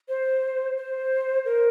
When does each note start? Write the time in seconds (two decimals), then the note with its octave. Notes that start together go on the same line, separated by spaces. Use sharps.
0.09 C5
0.77 C5
1.45 A#4